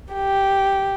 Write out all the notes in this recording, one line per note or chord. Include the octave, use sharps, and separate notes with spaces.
G4